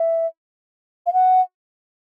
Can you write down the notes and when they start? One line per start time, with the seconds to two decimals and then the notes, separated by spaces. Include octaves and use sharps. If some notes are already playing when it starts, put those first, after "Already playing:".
Already playing: E5
1.06 F5
1.13 F#5